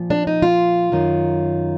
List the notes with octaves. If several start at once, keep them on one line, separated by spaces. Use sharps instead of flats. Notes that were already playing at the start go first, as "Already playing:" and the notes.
Already playing: A#2 F3
D4
D#4
F4
F#2 D#3